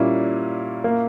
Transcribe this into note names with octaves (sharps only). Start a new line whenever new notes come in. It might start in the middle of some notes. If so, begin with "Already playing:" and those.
Already playing: A#2 G3 A#3 C#4 E4
A#3